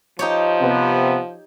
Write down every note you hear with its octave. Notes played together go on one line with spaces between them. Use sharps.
F3 D#4 G4 C#5
C3 B3